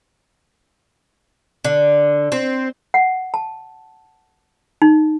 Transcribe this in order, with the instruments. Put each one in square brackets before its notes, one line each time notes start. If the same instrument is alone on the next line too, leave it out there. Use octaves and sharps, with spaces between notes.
[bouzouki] D3
C4
[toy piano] F#5
A5
D#4